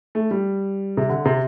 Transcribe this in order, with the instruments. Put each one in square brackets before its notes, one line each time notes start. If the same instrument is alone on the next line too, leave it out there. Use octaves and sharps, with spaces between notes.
[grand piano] A3
G3
C3
D3
C3